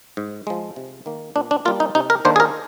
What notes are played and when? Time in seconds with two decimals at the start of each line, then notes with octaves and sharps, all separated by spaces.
0.17 G#2
0.47 F3 G#3
0.76 C3
1.06 D#3 A#3
1.36 A#2 D4
1.51 D4
1.65 G3 A#3 F4
1.80 D#4
1.95 C3 D#4
2.10 A#4
2.25 D#3 A#3 D4 C5
2.36 G#4
2.40 A#4